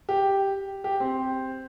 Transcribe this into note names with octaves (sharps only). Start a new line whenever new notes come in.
G4
G4
C4